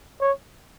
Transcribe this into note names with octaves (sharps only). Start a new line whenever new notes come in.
C#5